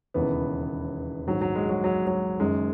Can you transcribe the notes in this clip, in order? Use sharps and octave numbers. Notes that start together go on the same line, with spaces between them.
E1 D#2 C#3 E3 B3
A#1 G#2 D#3 F#3
F#3
G#3
F#3
F#3
F#3
F#1 F#2 D#3 G#3